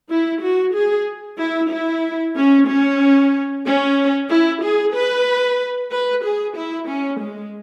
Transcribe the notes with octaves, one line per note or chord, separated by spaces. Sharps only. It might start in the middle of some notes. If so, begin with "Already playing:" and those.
E4
F#4
G#4
E4
E4
C#4
C#4
C#4
E4
G#4
B4
B4
G#4
E4
C#4
G#3